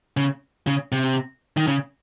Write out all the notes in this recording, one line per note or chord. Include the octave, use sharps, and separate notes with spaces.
C#3
C#3
C3
D#3
C#3